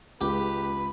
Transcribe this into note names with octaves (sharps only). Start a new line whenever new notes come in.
C#2 G4 G#4 B4